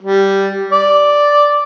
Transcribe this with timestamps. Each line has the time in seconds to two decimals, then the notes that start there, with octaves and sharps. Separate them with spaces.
0.01 G3
0.72 D5